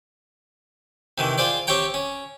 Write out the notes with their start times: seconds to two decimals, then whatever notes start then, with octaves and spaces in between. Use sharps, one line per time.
1.18 C3 D#3 E3
1.38 F4 G#4 C5 D5
1.67 C4 G4 C#5 G5 A#5
1.94 C#4